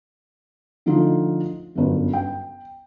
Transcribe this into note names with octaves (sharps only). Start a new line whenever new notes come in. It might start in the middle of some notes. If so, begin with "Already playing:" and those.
D3 F3 A3 D#4 F4
G1 F#2
G5